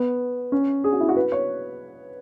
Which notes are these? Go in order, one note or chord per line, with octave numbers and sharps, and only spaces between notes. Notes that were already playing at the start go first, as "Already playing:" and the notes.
Already playing: B3
C#4
G#4
F#4
E4
F#4
B4
C#5